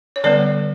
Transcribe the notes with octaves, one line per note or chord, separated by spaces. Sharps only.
C#5
D3 G3 B3 B4 D5